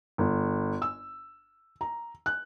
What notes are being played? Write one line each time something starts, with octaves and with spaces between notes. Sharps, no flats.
G1
E6
A#5
F#6